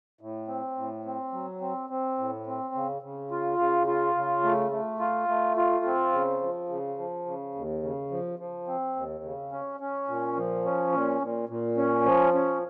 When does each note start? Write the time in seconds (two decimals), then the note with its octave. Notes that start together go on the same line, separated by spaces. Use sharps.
0.21 A2
0.48 C4
0.77 A2
1.05 C4
1.33 F#3
1.61 C4
1.90 C4
2.18 A2
2.47 C4
2.74 C#3
3.02 C#3
3.31 F4
3.59 C#3
3.87 F4
4.15 C#3
4.44 A3
4.71 A3
5.00 F4
5.28 A3
5.57 F4
5.85 C4
6.13 C#3
6.41 F3
6.69 C#3
6.98 F3
7.26 C#3
7.55 D#2
7.83 C#3
8.11 F3
8.39 F3
8.67 C4
8.96 D#2
9.24 C#3
9.52 C#4
9.80 C#4
10.08 A#2
10.36 F3
10.65 C#4
10.92 A#2
11.22 A#2
11.49 A#2
11.77 C#4
12.05 F3
12.34 C#4